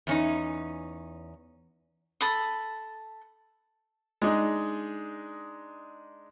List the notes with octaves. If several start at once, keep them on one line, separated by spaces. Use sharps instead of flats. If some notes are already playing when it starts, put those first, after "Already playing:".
E2 C#4 D#4
A4 B5 D#6
G#3 D4 D#4